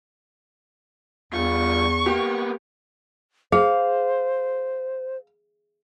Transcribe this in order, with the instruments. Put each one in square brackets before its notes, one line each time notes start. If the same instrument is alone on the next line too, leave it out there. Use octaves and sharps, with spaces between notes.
[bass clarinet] E2 [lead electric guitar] G2 F4 [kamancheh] C#6
[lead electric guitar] A#3 B3 [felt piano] G4
[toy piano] G#4 [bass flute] C5 [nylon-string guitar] F5